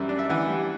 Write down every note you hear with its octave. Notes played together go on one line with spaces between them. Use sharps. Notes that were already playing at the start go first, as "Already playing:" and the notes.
Already playing: F#2 E3 G3 D5 E5
D4
E5
E3 F#5
G3